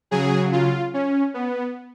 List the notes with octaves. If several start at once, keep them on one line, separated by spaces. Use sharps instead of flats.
C#3 F#3 G#4
F4
C#4
B3